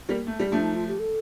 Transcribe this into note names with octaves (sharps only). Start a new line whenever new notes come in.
G3 A#3
A3
G3
F3 A3 D4
D#4
F4
G4
A4